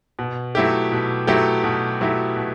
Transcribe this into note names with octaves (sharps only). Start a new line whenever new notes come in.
B2
F#3 A3 E4 G4
B2
F#3 A3 E4 G4
B2
F#3 A3 E4 G4
B2